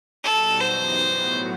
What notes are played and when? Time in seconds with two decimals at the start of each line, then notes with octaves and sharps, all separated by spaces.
0.24 B2 G3 D#4 F#4 A4
0.60 F#2 E3 B3 D#4 G4 C5
0.96 A2 F#3 B3 F#4